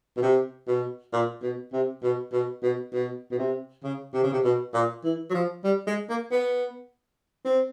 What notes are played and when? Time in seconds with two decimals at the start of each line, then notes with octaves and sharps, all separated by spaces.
0.17 B2
0.23 C3
0.68 B2
1.13 A#2
1.42 B2
1.73 C3
2.03 B2
2.33 B2
2.63 B2
2.93 B2
3.31 B2
3.38 C3
3.83 C#3
4.14 C3
4.23 C#3
4.33 C3
4.44 B2
4.74 A#2
5.04 E3
5.30 F#3
5.34 F3
5.64 G3
5.87 G#3
6.09 A#3
6.32 B3
7.45 C4